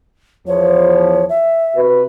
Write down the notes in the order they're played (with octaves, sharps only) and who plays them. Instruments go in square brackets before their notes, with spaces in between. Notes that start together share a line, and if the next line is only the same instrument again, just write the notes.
[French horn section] E2 F3 [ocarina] C#5
[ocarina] E5
[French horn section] C3 F#4 B4